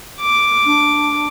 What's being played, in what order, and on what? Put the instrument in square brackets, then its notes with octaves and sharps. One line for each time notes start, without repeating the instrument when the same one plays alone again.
[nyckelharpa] D6
[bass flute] D4